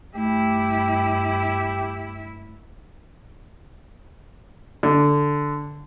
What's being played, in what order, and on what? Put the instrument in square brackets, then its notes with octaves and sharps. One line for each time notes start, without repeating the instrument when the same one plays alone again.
[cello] G2 E4 [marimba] A3 [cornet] G4
[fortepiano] D3